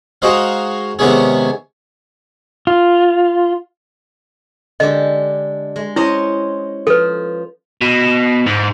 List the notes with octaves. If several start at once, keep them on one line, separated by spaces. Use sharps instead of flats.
G#3 D#4 F#4 C5 D#5 F5
C3 D#3 G#3 B3 C#4 G#4
F4
D3 G#3 G4 D#5
G#3
C#4 E4 C5 D#5
F3 A4 B4
B2
G#2